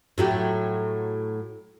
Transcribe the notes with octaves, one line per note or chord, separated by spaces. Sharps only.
A2 F#3 G4